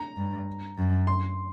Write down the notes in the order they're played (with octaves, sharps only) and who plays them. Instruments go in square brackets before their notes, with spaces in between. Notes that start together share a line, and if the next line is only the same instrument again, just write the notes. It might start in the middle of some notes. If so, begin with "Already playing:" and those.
Already playing: [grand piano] A#5
[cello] G2
F#2
[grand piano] C6